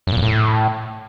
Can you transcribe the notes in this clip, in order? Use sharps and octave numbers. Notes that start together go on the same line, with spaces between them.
F#2
A#2
E2
A2